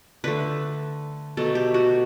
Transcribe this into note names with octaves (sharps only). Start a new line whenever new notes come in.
D3 A3 B4
B2 F#3 A3 A4
G4
F#4